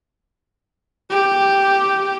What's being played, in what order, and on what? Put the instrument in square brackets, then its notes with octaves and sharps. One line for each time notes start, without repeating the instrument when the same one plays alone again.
[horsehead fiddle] G4